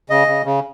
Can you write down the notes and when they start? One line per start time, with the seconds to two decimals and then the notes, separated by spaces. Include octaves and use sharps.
0.10 C#3 D#5
0.28 C#3
0.45 C#3